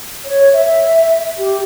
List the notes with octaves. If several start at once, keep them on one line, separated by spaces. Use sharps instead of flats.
C#5
E5
G4